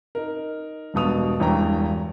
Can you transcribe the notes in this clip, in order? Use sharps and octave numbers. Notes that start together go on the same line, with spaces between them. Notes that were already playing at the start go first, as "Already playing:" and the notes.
D#4 A#4
E1 G2 B2 D#6 F7
E1 E2 G2 C#5 G5 A#5